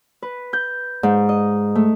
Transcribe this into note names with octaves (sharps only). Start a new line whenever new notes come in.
B4
G6
G#2
D#5
A3